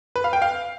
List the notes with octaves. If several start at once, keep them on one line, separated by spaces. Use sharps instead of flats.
B4
F5
G5
F5